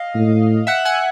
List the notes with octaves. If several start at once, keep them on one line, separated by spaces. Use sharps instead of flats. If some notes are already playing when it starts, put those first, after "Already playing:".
Already playing: D#5 F5
A2
E5 F#5
F#5 G#5